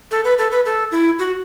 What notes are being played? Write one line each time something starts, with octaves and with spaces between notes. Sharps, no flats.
A4
B4
A4
B4
A4
E4
F#4